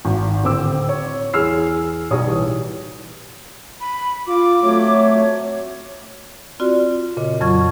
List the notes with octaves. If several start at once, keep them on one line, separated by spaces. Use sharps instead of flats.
G#1
D1 C4 D6 E6
C#5
E2 G#4 E6 F6 C7
B1 G3 C#5 D#6
E3
B5
F4 D6
F#3 A3 C4 F#4 C#5
C4 F4 F#4 D5
A#2 C#3 D#5
F2 C#3 F#3 F4 C#6 G#6